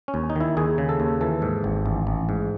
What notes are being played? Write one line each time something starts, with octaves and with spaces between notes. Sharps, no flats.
C#4
D#2
D#4
D#3 E4
D#2 G#4
C#3
A4
D#2
E3 A4
G#2
G#1
A1
A1
G#2